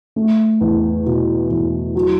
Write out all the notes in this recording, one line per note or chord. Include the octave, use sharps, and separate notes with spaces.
A3
E2
B2
E2
F#3